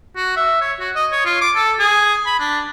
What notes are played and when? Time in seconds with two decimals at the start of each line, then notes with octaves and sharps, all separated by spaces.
0.16 F#4
0.36 E5
0.61 C#5
0.80 F#4
0.95 D#5
1.11 C#5
1.25 F4
1.41 D6
1.55 A4
1.79 G#4
2.26 B5
2.39 D4